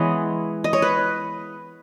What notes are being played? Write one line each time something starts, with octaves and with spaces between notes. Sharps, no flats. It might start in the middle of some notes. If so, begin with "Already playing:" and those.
Already playing: E3 G#3 B3 C#5 D#5
D#5
C#5
B4